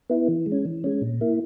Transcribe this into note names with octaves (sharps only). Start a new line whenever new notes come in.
B3 E4
E3
G#3
C#4
E3
G#3 C#4
A#2
A#3 E4